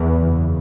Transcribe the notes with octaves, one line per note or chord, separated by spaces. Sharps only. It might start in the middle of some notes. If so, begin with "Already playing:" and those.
Already playing: E2 E3
F#1 F#2 C#3